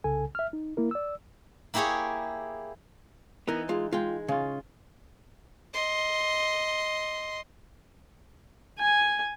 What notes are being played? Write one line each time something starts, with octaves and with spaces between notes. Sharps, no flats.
C2 C#3 A4 G#5
E5 F6
D#4
A#3 E4 A#4
D5 E6
A#3 E4 G4 G#4 C#5
E3 B3 D#4 A#4
G#3 F4
G#3 F4 G5
C#3 C#4 F4
D#5 C6
G#5